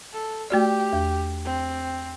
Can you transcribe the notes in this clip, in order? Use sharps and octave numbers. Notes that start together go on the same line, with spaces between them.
A4
A3 F#4 G4 D5
E2
C4